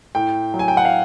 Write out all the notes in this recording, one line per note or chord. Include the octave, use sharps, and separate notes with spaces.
A2 G5
F#3
G#5
G5
F#5
F5